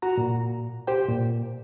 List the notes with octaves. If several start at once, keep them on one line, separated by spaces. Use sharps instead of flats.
F#4 A#5
A#2
G4 C5 G5
A#2